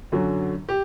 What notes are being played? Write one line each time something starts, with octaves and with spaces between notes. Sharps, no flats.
F#2 D3 F#3
G4